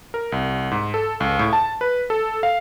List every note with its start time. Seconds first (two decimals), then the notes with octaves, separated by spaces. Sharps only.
0.14 A#4
0.32 C2
0.71 G#2
0.94 A4
1.20 C#2
1.39 A2
1.53 A5
1.81 B4
2.10 A4
2.43 F5